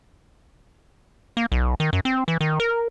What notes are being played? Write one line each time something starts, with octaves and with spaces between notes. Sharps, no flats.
A#3
B1
D#3
F#2
C4
E3
D#3
A#4